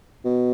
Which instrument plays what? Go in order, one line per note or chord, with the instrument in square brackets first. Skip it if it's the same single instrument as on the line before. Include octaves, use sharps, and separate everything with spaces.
[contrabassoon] B2